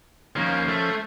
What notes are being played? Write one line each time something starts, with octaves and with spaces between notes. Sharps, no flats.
D#3 F3 A#3 C#4 C5
A3